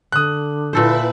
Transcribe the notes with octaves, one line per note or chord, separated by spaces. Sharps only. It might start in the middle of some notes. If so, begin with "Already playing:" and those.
D3 D#6 F#6
A#2 E4 A4 B4 C5